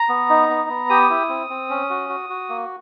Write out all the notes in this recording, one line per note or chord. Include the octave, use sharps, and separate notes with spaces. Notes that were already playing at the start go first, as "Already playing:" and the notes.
Already playing: A#5
B3
D#4
B3
B3
G4 D#6
E4
C4
C4
C#4
F#4
F#4
F#4
A#3